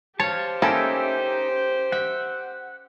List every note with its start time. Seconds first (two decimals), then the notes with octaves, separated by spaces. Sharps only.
0.20 G4 C5 C#5 F5 A5
0.62 A#3 C#4 D#4 E4 A4 E5 G5
1.92 E5 F#5